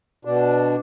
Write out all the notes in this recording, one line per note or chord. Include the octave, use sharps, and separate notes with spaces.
B2 D4